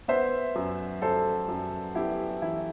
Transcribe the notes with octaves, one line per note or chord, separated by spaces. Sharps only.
B3 C5 E5
F#2
F#2 A4 C5
F#2
B3 E4 G4
E3 E4